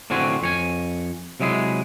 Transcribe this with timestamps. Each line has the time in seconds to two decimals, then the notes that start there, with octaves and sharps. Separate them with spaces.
0.10 A2 D3 C4 F#4 G#5
0.42 F2 C#5 G#5
1.40 C3 F#3 G#3 E4 G#4